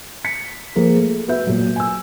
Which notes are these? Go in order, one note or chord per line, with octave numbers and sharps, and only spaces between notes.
B6 C#7
F3 A#3 G#4 A#4 C5
A3
B3 F#4 B4 E5 G6
A#2 F#3
G#5 E6